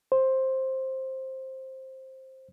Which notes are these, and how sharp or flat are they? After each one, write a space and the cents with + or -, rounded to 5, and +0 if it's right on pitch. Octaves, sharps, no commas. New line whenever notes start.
C5 +10